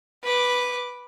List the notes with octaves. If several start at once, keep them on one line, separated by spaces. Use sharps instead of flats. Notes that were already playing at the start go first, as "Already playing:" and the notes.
B4 D6